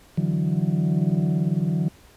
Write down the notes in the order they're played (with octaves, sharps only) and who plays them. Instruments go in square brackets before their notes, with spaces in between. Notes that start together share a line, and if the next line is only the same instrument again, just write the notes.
[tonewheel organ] D3 E3 F#3